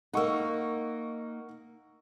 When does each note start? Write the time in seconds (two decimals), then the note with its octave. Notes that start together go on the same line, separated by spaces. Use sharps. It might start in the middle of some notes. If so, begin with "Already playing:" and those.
0.13 A#3 D#4 F#5 C#6 E6